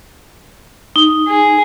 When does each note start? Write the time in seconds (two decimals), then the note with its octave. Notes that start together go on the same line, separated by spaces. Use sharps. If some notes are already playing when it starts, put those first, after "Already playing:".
0.96 D#4
1.28 G#4